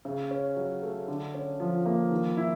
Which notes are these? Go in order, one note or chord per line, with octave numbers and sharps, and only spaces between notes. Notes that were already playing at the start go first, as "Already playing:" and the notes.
C#3
C#4
F#3
A3
D3
C#4
F3
A#3
D#3
E4